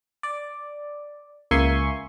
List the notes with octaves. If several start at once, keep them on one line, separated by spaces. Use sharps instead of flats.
D5
C#2 A#3 E5 G#5 C6 C#6